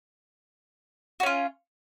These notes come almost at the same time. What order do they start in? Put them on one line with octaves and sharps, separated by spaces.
F#4 C#4 F4